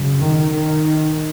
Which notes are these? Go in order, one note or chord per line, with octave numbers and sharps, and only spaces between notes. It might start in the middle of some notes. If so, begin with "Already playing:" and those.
Already playing: F#2 C#3
D#3
D#3